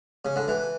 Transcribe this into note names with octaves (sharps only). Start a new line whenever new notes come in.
C#3
D3
E3